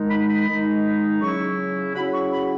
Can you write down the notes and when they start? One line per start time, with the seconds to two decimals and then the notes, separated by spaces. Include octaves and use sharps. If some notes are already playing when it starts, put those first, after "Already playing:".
Already playing: D#3 G#3 D#4
0.09 B5
0.28 B5
0.47 D#3 G#3 D#4
1.21 C#3 F#3 C#4 E4 C#6
1.95 C#3 F#3 C#4 E4 B5
2.14 C#6
2.32 B5